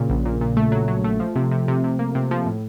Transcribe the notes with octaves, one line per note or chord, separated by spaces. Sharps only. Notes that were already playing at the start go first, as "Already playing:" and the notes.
Already playing: A#2 C#3
A#1
A#2
A#2
A3
F#3
F#3
A3
F3
C3
C3
C3
C3
A#3
C3
F3
A2